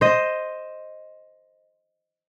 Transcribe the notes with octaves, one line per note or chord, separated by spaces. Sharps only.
C5 D#5